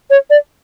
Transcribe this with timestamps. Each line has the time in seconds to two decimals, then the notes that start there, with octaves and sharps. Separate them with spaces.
0.10 C#5
0.30 D5